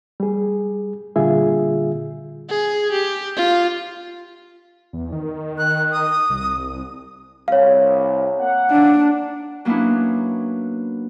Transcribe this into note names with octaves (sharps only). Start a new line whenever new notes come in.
G3 G#4
A#2 D3 G3 F4 G#4 E5
G#4
G4
F4
E2
D#3
F#6
D#6
C2
C2 C#5 F5
A#3 F#5
D4
F#3 A#3 B3 C#4 D4 E4